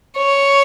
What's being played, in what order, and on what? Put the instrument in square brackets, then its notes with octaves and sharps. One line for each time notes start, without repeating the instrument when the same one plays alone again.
[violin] C#5